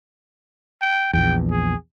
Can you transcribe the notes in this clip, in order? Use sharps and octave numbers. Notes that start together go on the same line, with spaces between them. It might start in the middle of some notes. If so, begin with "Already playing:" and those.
G5
A#1 E2 G5
G#4